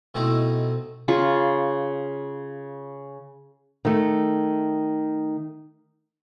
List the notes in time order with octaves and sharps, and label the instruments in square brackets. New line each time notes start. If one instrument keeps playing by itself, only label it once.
[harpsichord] B2 A3 C4 D#4 E4
[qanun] C#3 F4 C#6
[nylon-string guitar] D#3 A3